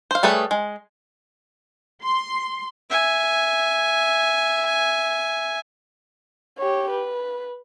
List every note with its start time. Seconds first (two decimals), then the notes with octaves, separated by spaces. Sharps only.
0.11 C5 F5
0.23 G3 A3 G#4 B4 C#5
0.51 G#3
2.04 C6
2.90 E5 G#5
6.59 G4 C#5
6.91 B4